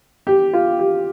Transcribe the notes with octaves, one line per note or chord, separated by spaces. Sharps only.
G4
F4
G4